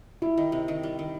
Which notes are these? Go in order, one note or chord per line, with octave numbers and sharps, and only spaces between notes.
G3 E4
D#3
C3
D#3
G3
D#3